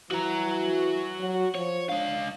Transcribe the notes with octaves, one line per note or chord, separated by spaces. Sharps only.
E3 F#4 A#5
F#3
F3 C#5
G#3 D4 F5